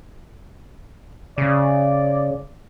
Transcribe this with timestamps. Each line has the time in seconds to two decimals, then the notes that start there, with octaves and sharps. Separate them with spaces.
1.38 C#3 D5